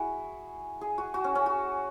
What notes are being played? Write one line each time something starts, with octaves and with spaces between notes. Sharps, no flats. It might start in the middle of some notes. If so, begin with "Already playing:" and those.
Already playing: E4 F#4 G#4
G#4
F#4
F#4
C#4
C#4
F#4